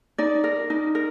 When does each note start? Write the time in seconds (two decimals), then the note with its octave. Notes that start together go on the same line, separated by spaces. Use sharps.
0.18 D#4 D5
0.44 A#4
0.70 D#4
0.95 A#4